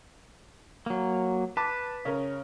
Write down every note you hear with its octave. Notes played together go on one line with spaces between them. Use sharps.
F#3 A#3
B4 A5 D6
C#3 C#4 A#4